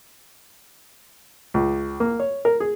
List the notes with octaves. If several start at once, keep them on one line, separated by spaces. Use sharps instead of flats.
C#2
A#3
C#5
A#4
G#4